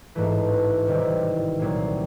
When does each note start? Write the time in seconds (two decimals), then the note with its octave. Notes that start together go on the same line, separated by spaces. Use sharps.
0.15 A1 G#2 E3 A3
0.87 C3 D#3 G3 C4 E4
1.59 C2 A#2 F#3 A#3